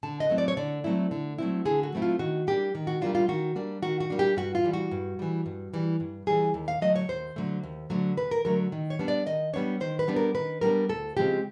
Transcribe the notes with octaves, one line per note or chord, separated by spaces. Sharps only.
D3 A5
D#5
F#3 A3 C4 E4
D5
C#5
D3 D5
F#3 A3 C4 E4
D3
F#3 A3 C4 E4
D3 G#4
F#4
F#3 A3 C4 E4
F4
D#3 F#4
G3 A#3 D4 G4
D#3
F#4
G3 A#3 D4 F4
F4
D#3 F#4
G3 A#3 D4
D#3 F#4
F#4
G3 A#3 D4
G4
G2 F#4
F4
E3 G3
F#4
G2
E3 G3
G2
E3 G3
G2
E3 G3 G#4
D#2
F5
D3 F#3 A3 D#5
C#5
D#2 C5
D3 F#3 A3
D#2
D3 F#3 A3
D#2 B4
A#4
D3 F#3 A3 A#4
D#3
C#5
G3 B3 D4
D5
D#3 D#5
G3 B3 D4 C#5
D#3 C5
B4
G3 B3 D4
A#4
D#3 B4
G3 B3 D4 A#4
D2 A4
C#3 F3 G#3 C4 G4